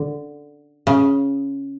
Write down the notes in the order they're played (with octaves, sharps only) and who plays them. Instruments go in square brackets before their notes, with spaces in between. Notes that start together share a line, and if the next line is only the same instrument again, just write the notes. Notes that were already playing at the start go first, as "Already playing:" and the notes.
Already playing: [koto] D3
C#3